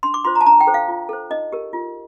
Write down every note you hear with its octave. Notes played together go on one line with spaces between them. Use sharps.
D4 C6
D6
F4 C5 C6
A#5
A5
D4 A#5
G5
A4 C5
F5
F4
A4 C5
D#4 D#5
G4 A#4
F4